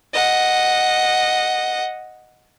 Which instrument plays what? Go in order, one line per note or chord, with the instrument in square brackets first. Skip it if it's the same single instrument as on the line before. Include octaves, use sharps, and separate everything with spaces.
[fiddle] D#5 F#5